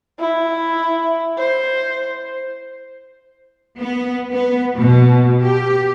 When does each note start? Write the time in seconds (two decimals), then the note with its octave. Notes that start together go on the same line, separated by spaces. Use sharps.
0.19 E4
1.37 C5
3.79 B3
4.31 B3
4.78 B2
5.42 G4